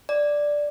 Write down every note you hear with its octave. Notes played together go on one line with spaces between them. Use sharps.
D5